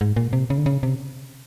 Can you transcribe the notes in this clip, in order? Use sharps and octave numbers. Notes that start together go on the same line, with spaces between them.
G#2
A#2
C3
C#3
D3
C#3
C3